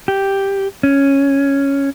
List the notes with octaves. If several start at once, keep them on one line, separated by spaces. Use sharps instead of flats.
G4
C#4